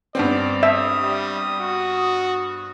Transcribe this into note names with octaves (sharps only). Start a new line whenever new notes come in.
G2 B3 C4 D5
E5 D#6
G3
F#4